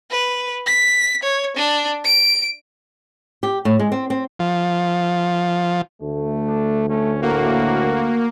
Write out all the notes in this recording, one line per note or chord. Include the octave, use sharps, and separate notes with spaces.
B4
B6
C#5
D4
D7
G4
A2
G#3
C4
C4
F3
D2 A3
D4
A3 C#4
A2 A#3 F#4